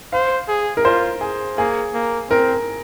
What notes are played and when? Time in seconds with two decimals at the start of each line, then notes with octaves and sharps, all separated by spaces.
0.13 C5 F5
0.48 G#4
0.77 A#4
0.85 F4 C5
1.21 G#4
1.58 A#3 G#4
1.93 A#3
2.29 C4 A#4